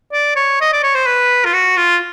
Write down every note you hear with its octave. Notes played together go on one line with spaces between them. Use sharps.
D5
C#5
D#5
D5
C#5
C5
B4
F4
F#4
F4